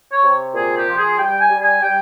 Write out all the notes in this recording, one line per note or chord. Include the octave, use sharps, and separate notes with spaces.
C#5
C3
A#2 G#4
G4
F3
G#4
G3 G5
G#5
G3
G#5
G3 G5